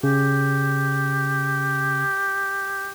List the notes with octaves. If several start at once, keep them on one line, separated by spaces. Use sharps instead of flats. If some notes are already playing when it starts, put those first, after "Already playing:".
C#3 G4